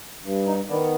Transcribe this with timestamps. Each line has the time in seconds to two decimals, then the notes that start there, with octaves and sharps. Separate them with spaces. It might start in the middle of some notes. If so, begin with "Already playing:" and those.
0.24 G2
0.47 D#4
0.69 D#3 B3 D4